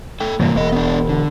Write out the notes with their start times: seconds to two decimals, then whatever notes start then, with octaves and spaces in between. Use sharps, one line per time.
0.20 A3 A4 G5
0.40 G2 C3 E3 F#3 A#3
0.55 E1 A#3 D#5
0.72 B3 D4
1.09 D3